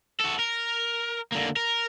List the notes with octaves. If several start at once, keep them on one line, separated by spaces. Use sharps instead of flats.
F#4 A4
A#4
D3 A#3
A#4